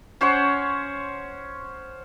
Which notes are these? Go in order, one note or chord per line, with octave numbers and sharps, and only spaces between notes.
C#4 C5 C#5 F#5